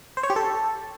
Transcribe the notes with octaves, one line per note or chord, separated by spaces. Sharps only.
C5
C#5
G4
A4